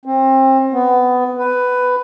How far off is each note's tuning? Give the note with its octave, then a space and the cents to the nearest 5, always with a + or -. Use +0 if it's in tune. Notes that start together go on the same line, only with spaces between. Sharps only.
C4 +30
B3 +20
B4 +10